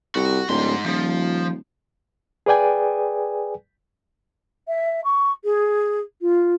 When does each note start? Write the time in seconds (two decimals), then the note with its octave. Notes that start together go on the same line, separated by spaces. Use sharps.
0.15 C2 F#4
0.49 D1 G#2 C6
0.86 D#1 F3
2.46 G#4 B4 D5 G5 G#5
4.67 E5
5.04 C#6
5.44 G#4
6.21 F4